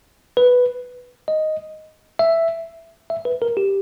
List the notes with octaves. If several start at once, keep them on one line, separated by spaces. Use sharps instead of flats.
B4
D#5
E5
E5
B4
A#4
G4